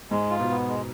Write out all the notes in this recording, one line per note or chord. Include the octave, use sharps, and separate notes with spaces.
G#2 G#3
F4
B2
B3
G#3